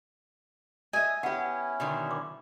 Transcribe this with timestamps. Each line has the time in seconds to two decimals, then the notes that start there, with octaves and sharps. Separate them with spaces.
0.93 D#5 E5 G#5
1.23 B3 C#4 E4 G4 F#5
1.80 B2 D3 D#3
2.11 D6